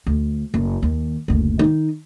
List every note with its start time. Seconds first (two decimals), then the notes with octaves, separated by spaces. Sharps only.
0.07 D2
0.54 F#1
0.82 D#2
1.28 F#1 D2
1.59 D#3 D#4